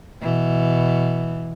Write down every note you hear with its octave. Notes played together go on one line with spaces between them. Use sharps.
B2 E3